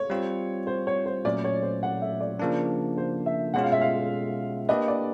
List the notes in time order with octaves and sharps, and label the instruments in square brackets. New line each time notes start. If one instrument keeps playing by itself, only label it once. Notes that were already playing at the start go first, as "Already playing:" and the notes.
Already playing: [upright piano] C#5
[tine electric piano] G3 C4 F4
[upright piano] C5
C#5
C5
[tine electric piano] A#2 F#3 A3 C#4 [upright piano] D5
[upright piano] C#5
C5
F#5
E5
D5
[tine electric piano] C#3 F3 A#3 D4
[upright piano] C5
E5
[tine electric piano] B2 G#3 C#4 F4 [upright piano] F#5
[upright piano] F5
E5
F5
[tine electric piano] A#3 D4 G4 B4 [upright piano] D#5
[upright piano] D5